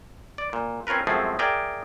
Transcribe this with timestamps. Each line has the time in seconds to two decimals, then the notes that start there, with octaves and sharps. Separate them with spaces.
0.38 D5
0.53 A#2
0.87 C4 C#4 F4 A#4 B4
1.07 F#2 F3 G#3 A3 C4 G#4
1.39 G#4 A#4 D5 E5 G5